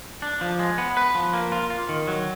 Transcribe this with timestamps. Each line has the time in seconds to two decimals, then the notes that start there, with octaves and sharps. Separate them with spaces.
0.22 D4
0.41 F3
0.59 G#3
0.78 B3
0.97 B4
1.15 F3
1.33 A#3
1.52 F4
1.70 F4
1.89 D#3
2.08 F#3